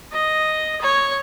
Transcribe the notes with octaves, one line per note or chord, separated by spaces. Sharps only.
D#5
C#5